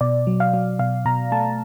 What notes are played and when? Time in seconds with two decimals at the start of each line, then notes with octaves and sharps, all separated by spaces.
0.01 B2 D5
0.27 F#3
0.40 F5
0.54 F#3
0.79 B2 F5
1.05 B2 A#5
1.32 A3 A5